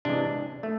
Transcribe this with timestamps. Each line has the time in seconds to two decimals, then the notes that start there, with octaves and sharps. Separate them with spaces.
0.05 C3 E3 G#3 D4
0.63 A3